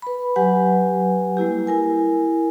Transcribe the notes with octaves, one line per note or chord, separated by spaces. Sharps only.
B4 B5
F#3 G4 B4 F#5 G#5
G3 A#3 E4 G4
E4 A#4 G#5